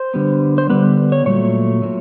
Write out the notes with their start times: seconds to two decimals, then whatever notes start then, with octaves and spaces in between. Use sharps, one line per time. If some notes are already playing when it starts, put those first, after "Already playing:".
Already playing: C5
0.14 D3 G3 B3
0.58 C5
0.69 D3 G3 B3 B4
1.12 C#5
1.26 A#2 F#3 A3 C#5
1.82 A#2 F#3 A3